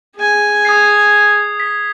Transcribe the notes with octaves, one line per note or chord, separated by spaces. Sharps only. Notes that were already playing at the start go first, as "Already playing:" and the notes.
G#4 G#5
D#6 G#6 C7
B6